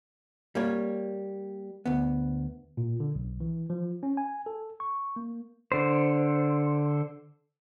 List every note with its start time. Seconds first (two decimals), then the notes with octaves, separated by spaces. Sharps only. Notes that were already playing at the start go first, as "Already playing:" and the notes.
0.55 G3 A#3 C#5
1.85 D2 B3
2.77 A#2
3.00 D3
3.15 B1
3.40 E3
3.70 F3
4.03 C#4
4.17 G#5
4.46 A4
4.80 C#6
5.16 A#3
5.72 D3 C5